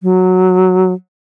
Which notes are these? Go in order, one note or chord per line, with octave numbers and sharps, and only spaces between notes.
F#3